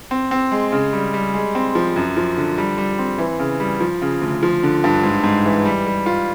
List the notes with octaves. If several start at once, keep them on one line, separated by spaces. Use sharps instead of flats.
C4
C4
G#3
C#3
G3
G3
G#3
C4
F3
F#2
F3
D3
G3
G3
C4
E3
C#3
G3
F3
C#3
D2
F3
D3
G2
G#2
G#2
E3
G3
G3
F4